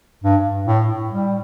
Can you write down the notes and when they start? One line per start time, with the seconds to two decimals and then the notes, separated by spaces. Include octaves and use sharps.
0.24 G2
0.67 A2
1.10 G3